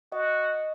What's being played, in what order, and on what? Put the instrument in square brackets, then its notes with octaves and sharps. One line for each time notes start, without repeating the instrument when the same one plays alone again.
[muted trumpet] F#4 [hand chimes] D#5